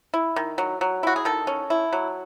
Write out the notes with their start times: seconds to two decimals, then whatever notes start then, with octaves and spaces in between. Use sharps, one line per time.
0.14 E4
0.36 D#3
0.58 F#3
0.81 F#3
1.03 E4 F#4
1.16 G#4
1.25 D#3 A4
1.47 C#4
1.70 E4
1.93 F#3